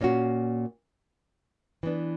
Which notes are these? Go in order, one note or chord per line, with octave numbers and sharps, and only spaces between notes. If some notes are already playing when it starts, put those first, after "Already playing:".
A#2 A#3 C#4 F#4
E3 B3 D4